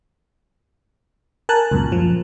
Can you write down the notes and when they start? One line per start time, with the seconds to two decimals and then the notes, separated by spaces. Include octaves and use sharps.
1.49 A#4 G#5 A5 F#6
1.71 C#2 F#2 A#2
1.92 F3